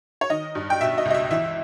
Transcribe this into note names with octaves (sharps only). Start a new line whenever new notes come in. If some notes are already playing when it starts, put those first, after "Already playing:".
C#5
D#3 D#5
G2
G5
B2 E5
D#5
C#2
D#5
E5
E3 E5